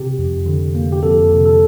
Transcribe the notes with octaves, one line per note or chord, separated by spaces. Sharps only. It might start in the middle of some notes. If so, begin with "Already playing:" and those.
Already playing: C3 G4
F2
D3
A#3
G4
F2 A4
C3
A4